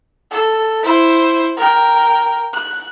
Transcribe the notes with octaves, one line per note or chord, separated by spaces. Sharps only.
A4
E4 C5
A#4 G5
F#6